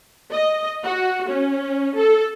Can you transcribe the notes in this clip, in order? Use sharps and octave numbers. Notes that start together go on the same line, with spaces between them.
D#5
F#4
C#4
A4